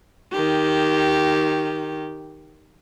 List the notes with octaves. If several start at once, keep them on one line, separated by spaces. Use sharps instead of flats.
D#3 G4